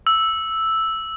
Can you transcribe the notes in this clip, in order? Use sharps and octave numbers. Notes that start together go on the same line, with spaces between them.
E6